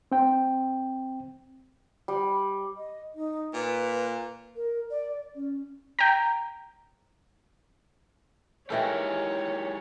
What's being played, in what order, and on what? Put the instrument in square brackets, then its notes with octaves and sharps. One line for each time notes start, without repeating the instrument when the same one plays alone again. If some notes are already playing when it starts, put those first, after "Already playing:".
[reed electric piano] C4 G5
[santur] G3
[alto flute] D#5
D#4
[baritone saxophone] A#2 [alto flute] B4
[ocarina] A#4
D5
C#4
[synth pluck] G5 A#5
[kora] D#3 E3 A4 [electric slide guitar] G#3 G4 A#4 [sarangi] C#5